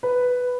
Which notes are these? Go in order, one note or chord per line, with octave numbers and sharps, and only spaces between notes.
B4